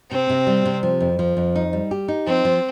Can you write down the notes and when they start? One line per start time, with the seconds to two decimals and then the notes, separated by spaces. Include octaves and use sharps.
0.11 C3 C4
0.30 C3
0.47 G3
0.65 C3
0.83 F3
1.00 F2
1.19 F3
1.37 F2
1.55 D#4
1.73 G3
1.91 G4
2.08 D#4
2.27 F3 C4
2.45 F3